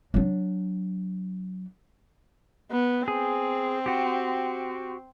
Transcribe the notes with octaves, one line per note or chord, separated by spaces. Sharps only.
F#3 D4
B3
C4 G#4
F#4 G4